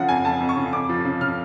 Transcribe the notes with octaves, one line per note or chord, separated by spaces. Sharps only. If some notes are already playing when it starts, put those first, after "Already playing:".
Already playing: C#3 F3 F5 F#5
F2 G#5
F2 A5
F2
C#6
C#3
F2 D6
F3
C#3
C#3 F6